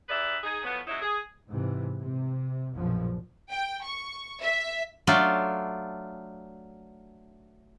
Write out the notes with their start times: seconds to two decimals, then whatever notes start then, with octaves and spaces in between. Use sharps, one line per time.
0.09 D#4 G4 G#4 B4 D5 E5
0.44 D#4 G#4
0.64 A2 F3 F#3 B3
0.87 F#3 G#3 C#4 D#4 E4
1.02 G#4
1.48 G#2 C3 E3
2.01 C3
2.74 A#1 F#2 B2 F3
3.51 G5
3.85 C#6
4.42 E5
5.07 F#3 A3 D4 F4